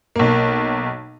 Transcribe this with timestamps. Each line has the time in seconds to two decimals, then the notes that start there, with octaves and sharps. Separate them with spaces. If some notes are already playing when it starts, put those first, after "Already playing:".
0.16 B1 A#3